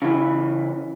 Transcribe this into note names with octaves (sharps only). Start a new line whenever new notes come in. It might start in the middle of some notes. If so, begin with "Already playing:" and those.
C#3 E3